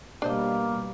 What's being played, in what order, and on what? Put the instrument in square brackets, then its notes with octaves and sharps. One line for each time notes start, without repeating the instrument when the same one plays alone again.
[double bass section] B2 G3 [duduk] A#3 [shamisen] D4 C5 D#5